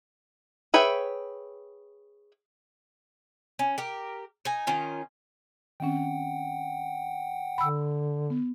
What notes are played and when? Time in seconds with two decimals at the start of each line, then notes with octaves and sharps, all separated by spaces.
0.74 G#4 B4 C#5 E5 G5
3.59 C#4
3.78 G4 A#4
4.45 D#4 G#5
4.67 D#3 C#4 F4
5.80 D#3 C4 C#4 F#5 G5
7.58 D3 B5 E6
8.30 B3